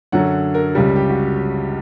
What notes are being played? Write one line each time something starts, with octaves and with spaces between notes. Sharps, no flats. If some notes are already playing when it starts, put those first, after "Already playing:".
F#2 D3 F#3 F#5
A#4
C#2 C#3 G3 G4
G4
F#4